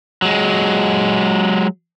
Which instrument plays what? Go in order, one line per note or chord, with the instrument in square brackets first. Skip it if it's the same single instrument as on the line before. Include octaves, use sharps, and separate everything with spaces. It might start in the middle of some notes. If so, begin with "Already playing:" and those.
[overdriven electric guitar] F#3 G#3